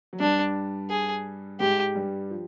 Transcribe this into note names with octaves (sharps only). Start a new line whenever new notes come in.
F#3
G2 G3 D4
G#4
G#2 G#3 G4
G2 G3
F3